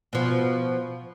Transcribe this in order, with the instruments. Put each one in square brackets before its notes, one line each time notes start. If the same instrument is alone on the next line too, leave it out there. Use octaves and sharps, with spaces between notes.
[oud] B2 F3